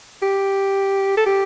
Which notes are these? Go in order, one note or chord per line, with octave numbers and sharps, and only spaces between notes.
G4
A4
G4